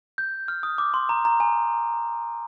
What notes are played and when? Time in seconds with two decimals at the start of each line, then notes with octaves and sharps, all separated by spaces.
0.18 G6
0.48 F6
0.63 D#6
0.78 D6
0.94 C6
1.09 A#5
1.25 A#5
1.40 G#5